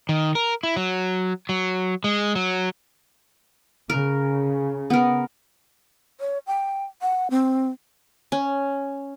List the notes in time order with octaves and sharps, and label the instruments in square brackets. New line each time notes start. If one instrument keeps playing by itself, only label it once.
[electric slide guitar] D#3
A#4
E4
F#3
F#3
G#3
F#3
[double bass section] C#3 [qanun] A#4
[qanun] B3 A#4
[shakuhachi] C#5
G5
F#5
C4
[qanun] C#4